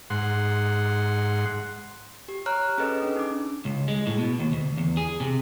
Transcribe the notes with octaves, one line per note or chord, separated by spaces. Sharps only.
G#2 F#5 C6
G4
C#5 A#5 F6 F#6
C#4 G#4 A4 B4 D#5
C#4 D4
D#4 D6
C#2
G#3
A2
B2
D#2
D2
E2
G#4
C3